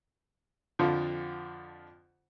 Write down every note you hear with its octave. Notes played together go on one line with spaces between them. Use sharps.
F2 D3 F3